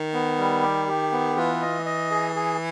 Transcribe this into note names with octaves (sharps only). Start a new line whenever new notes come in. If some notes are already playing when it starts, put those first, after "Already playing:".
Already playing: D#3
B3
G3
G4
G4
B3
E3 F4
D#5
D#5
G#4
G#4